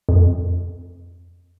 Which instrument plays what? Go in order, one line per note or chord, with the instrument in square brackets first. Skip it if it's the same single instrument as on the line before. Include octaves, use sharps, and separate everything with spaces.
[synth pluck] F2